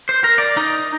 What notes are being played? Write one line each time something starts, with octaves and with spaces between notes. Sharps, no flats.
C5
A#4
D5
D#4